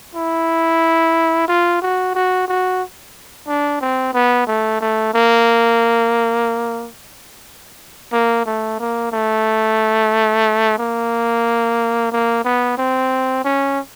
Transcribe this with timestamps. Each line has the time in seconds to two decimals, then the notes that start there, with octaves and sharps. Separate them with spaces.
0.15 E4
1.48 F4
1.82 F#4
2.15 F#4
2.48 F#4
3.47 D4
3.81 C4
4.14 B3
4.47 A3
4.81 A3
5.14 A#3
8.12 A#3
8.46 A3
8.80 A#3
9.12 A3
10.78 A#3
12.12 A#3
12.45 B3
12.78 C4
13.45 C#4